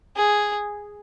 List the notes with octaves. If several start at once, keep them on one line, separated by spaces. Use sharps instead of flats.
G#4